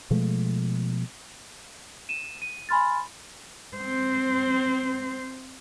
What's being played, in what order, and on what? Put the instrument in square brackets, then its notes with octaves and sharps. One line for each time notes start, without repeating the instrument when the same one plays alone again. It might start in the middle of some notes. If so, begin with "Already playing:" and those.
[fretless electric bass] B2 F3 G#3 A3
[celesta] D#7 E7
D#7
G#5 B5 C6 F6 A6
[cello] C4 C5